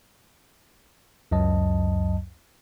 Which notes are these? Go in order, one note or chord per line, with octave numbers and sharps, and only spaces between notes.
C#2 F#2 F#3 D#5 A5